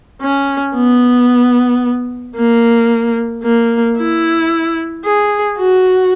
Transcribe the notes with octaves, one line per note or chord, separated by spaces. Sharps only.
C#4
B3
A#3
A#3
E4
G#4
F#4